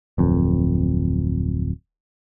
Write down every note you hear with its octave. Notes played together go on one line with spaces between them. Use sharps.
D1 F2